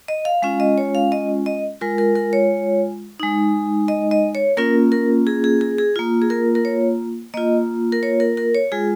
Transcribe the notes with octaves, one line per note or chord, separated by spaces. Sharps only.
D#5
F5
G#3 C#4 F4 F5
D#5
C#5
F5
D#5
D#5
G#3 F4 A#4
A#4
A#4
C#5
G#3 D#4
D#5
D#5
C#5
A#3 C#4 F4 A#4
A#4
G#4
G#4
G#4
G#4
A#3 F4
G#4
A#4
A#4
C#5
A#3 F4 D#5
A#4
C#5
A#4
A#4
C#5
G#3 F4 G#4